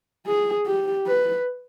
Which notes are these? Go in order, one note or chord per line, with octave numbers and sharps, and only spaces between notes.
G#4
G4
B4